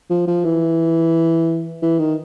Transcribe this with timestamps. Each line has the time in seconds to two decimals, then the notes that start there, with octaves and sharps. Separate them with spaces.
0.10 F3
0.27 F3
0.45 E3
1.82 E3
1.99 D#3